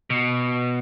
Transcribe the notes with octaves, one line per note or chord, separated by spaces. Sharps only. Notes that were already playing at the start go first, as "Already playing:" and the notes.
B2